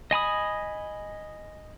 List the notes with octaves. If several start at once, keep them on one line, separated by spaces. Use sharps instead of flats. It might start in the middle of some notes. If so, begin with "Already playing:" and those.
D#5 G#5 B5 D#6